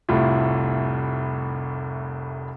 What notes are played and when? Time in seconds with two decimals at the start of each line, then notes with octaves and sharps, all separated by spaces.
0.09 F1 C2 A2 E4 F4